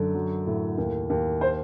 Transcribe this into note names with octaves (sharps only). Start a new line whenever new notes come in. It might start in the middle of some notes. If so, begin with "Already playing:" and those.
Already playing: F#2 D3
F#3
A2
D#2
D#2
C5